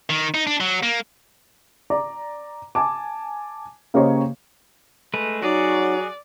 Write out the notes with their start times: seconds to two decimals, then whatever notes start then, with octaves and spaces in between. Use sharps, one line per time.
0.10 D#3
0.34 D#4
0.47 D4
0.60 F#3
0.83 A#3
1.90 D5 A#5 D6
2.75 G#5 A5 D6
3.94 C#3 A#3 G4 C5 C#5 D#5
5.14 G#3 A3 B4
5.43 F#3 D#4 F#4 G#4 C#5 D5